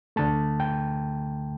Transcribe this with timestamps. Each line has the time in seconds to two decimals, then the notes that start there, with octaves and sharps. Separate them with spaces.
0.16 D2 D3 A3 A5
0.60 G5